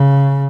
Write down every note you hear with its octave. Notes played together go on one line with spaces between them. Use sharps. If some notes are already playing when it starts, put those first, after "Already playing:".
Already playing: C#3